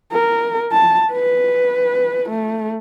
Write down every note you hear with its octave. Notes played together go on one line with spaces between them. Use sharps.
A#4
A5
B4
A3